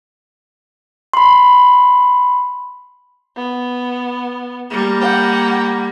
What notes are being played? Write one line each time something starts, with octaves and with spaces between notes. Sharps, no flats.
B5 C6
B3
G3 A#3
F#5 G5